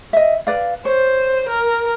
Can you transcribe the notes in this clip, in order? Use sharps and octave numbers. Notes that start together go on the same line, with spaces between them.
D#5 E5
B4 D5 F5
C5 C#5
A#4